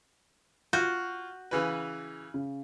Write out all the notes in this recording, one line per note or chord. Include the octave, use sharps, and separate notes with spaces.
F4 F#4 G6
C#3 E3 B4
C#3